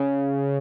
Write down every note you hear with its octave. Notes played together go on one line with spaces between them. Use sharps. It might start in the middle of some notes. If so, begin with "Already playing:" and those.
Already playing: C#3